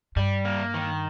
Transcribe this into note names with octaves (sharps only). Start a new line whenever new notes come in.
G2 G3
A#3
D#3